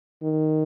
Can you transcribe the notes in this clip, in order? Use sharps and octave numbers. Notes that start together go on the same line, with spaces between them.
D#3